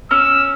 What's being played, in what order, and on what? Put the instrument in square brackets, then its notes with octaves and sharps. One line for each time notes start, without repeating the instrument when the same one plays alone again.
[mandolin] C#4 [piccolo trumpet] E6